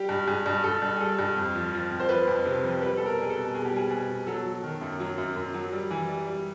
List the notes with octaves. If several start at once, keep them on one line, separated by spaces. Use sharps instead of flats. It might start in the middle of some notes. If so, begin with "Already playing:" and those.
Already playing: G3 G4
G2
G2 G#4
G2
G2 A4
G2
G#4
G3 A4
G2
F2
F3
F3
F2
C5
F3 B4
F2
C3
F3
G3 B4
B2 A4
A#4
G3 G#4
A4
B2
B2 G#4
G4
G3 G#4
B2 G#4
B2
F#3 A4
F#3
D#3
F#2
F#3
F#2
F#2
F#3
G3
E3
G3
G3